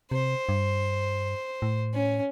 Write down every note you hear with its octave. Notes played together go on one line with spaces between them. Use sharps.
C3 C5
G2
A2
C#4